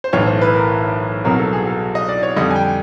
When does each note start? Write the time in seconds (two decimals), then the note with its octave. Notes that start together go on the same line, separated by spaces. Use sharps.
0.04 C5
0.13 B1 A2 E3 C#5
0.27 C5
0.41 B4
0.55 A#4
1.25 C2 B2 F#3 A#4
1.39 A4
1.53 G#4
1.67 A4
1.95 D#5
2.08 D5
2.23 C#5
2.36 F2 D3 G3 D#5
2.51 G#5
2.56 G5